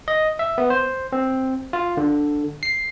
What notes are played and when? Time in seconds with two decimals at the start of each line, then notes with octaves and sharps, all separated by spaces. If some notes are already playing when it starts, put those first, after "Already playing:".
0.08 D#5
0.39 E5
0.58 B3
0.70 C5
1.12 C4
1.73 F4
1.97 D3
2.63 C7